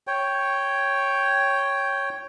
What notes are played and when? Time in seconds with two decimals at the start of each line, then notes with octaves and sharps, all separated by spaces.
0.07 C#5 G5